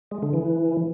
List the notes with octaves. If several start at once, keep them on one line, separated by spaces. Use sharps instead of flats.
G#3
D3
E3